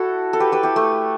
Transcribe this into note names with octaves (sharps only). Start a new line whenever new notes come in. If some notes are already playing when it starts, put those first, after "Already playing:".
Already playing: E4 F#4 A4
A4
G4 B4
G4 B4
E4 G4
A3